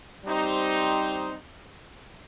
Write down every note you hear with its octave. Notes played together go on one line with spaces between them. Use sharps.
G3 C4 D#4 G4 C5